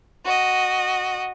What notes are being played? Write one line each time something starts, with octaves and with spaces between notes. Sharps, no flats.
F#4 D#5